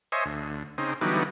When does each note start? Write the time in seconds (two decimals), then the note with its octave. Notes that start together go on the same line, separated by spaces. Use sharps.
0.12 C5 C#5 D#5 E5 G#5
0.25 D2
0.78 C#3 C4 D#4
1.01 D3 E3 F#3 G3 B3 D#4